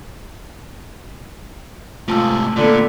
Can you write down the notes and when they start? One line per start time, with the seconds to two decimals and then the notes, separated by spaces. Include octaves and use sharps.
2.08 G#2 C3 A3 F4 A5 E6
2.56 A#2 D3 B3 F4